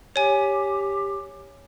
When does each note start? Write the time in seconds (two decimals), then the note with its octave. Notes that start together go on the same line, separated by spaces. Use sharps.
0.16 G4 C#5 G#5